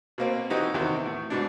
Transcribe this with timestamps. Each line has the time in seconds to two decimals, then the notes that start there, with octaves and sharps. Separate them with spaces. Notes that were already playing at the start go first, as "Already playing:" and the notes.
0.18 B2 A#3 C4
0.50 E3 C4 D#4 F#4 G4
0.74 E2 C3 D#3 F#4
1.06 A2
1.30 G#2 B2 D4